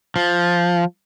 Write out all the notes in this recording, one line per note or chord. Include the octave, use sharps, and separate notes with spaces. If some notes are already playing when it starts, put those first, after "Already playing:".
F3